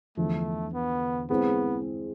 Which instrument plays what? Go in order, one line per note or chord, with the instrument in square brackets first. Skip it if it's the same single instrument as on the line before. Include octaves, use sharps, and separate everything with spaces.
[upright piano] E2 D3 F3 [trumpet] A3
[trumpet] B3
[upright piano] G#3 C4 E4 G#4 [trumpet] B3